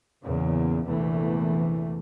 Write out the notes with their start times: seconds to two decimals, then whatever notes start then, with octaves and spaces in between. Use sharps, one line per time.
0.24 E2 A#2 C#3
0.86 A#1 E2 C3 E3 A3